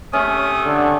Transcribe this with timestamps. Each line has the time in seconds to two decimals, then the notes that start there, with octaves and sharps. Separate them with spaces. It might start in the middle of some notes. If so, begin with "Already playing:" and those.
0.13 C3 A3 C#4 D#6
0.65 D3